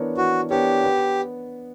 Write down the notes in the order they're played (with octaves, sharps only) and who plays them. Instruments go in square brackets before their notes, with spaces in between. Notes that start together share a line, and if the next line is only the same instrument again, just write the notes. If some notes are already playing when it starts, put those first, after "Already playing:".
Already playing: [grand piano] E3 B3 D4 A#4 C#5
[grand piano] E3 [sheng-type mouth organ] F#4
[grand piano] B3 D4 A#4 C#5 [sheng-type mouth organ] G4
[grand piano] B3